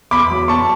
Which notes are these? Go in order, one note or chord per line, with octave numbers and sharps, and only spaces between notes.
E2 B5 D6
F#3
E2 A5 C#6